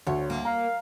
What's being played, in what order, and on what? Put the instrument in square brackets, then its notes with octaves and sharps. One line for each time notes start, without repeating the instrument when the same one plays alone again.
[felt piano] D2 [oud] C#5
[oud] A#3
[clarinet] F5 [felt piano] A#5